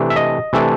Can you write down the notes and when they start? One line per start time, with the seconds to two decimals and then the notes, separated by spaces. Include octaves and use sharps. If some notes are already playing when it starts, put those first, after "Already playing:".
Already playing: C3 E3 A3 D4
0.10 E5
0.16 D#5
0.53 C3 E3 A3 D4